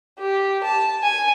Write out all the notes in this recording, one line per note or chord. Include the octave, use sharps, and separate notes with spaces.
G4
A5
G#5